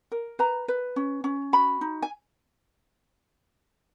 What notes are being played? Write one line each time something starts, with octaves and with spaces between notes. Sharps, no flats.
A#4
B4 A#5
B4
C#4
C#4
F#4 B5
D#4
G#5